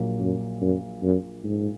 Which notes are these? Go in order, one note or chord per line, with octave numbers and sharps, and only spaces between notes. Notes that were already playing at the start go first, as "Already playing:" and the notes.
Already playing: A#1 A#2 F#3 A#3
F#2
F#2
F#2
G#2